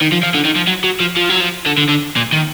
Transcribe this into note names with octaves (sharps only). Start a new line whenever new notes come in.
D#3
F3
F3
D3
D#3
F3
F#3
F#3
F3
F3
F#3
F3
D3
D3
D3
A#2
D#3